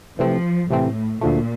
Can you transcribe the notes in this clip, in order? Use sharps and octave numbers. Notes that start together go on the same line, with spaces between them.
C3 E3 F3 A3 C4
A2 C3 E3 A3 C4
D2 A#2 D3 F3 A3